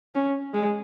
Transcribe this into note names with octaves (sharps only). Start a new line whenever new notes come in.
C#4
G#3